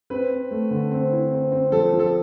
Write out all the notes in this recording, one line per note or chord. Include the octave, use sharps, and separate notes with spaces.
C4 B4
C4
A3
D3
C4
E4
C4
C4
F3 A4
F3
A4